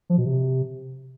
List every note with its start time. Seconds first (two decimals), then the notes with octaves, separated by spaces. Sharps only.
0.10 F3
0.18 B2
0.26 C3